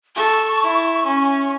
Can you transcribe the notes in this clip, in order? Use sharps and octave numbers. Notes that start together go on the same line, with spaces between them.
A4 C#6
E4
C#4